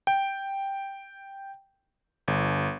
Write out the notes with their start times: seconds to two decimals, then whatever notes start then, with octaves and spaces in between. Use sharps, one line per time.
0.07 G5
2.28 G1